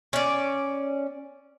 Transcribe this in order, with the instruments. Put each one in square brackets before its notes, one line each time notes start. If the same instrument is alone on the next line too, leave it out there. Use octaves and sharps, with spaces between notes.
[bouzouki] C#4 D5